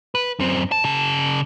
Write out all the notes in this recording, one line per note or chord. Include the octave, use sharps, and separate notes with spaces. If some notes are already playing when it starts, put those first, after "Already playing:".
B4
F#2 C4
A5
C#3 A5